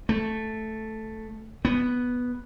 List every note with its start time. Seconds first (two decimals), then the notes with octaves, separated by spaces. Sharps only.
0.09 A3
1.65 B3